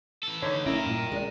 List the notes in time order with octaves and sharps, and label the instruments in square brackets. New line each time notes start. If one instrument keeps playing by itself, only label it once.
[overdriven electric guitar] E3 A4
[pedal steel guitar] D3 D#4 [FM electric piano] C#5 G#6 B6
[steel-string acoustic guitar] A#3 E4 [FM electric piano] C#4 [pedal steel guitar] A#4 [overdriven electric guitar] G5 A#5
[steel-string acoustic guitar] G2 A#2
G#3 D4